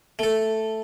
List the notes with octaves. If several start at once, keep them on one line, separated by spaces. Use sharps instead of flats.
A3 A4